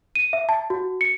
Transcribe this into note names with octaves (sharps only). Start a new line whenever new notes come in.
D#7
E5
A5
F#4
C#7